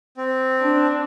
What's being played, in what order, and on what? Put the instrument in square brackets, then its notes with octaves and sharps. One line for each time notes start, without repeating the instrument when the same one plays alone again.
[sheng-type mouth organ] C4
[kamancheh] D4